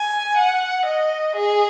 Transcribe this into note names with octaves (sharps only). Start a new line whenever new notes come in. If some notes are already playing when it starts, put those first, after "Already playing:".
Already playing: G#5
F#5
D#5
G#4